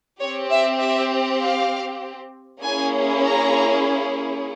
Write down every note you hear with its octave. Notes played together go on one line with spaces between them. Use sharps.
C4 G4 C#5
E5
E5
F5
A#3 C#4 E4 G#4 G#5
A#5